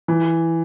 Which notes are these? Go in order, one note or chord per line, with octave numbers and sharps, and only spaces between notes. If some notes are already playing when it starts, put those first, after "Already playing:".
E3